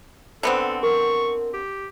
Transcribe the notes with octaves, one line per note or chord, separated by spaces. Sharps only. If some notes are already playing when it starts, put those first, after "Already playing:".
D3 B3 C4 A4
A#4 C#6
G4